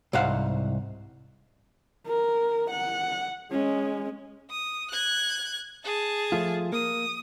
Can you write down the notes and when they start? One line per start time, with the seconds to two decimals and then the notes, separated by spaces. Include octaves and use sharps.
0.13 C2 G#2 C5 F5 F#5
2.07 A#4
2.71 F#5
3.52 G#3 C#4
4.50 D#6
4.91 F#6 G#6
5.84 G#4 A5
6.32 F3 A3 F4
6.72 A#3 D#6